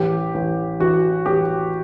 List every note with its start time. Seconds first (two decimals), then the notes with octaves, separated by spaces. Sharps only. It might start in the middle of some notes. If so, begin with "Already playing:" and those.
Already playing: A1 G4
0.34 A1
0.80 E3 F#4
1.26 A1 G4